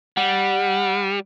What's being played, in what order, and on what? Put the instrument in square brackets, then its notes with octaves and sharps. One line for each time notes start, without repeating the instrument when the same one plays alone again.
[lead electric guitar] G3 [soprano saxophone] F#5